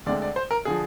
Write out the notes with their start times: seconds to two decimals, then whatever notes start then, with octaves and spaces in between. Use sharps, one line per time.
0.06 D2 D3 G#3 C4 D5
0.22 D5
0.36 C5
0.51 A#4
0.65 D3 F3 G#4